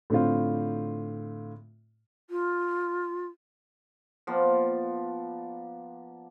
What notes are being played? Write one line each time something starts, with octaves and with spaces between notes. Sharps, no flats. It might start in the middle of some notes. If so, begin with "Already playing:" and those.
A2 D3 C4 F4
F4
F3 A#3 B3 D5